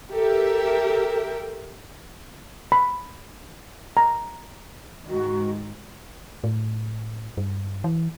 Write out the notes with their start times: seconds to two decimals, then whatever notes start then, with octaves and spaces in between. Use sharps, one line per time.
0.12 G4 A4 A#4 E5 G5
2.72 B5
3.97 A#5
5.09 G#2 D#3 F#4
6.44 A2
7.37 G2
7.84 E3